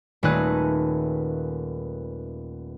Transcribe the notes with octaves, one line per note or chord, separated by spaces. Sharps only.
D#1 A3 D#4 G#4 B4 F#6